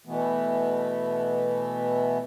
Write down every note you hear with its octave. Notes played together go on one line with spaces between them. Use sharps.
B2 E3 A3 B3